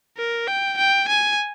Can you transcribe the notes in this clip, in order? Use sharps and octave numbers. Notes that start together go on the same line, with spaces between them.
A#4
G5
G5
G#5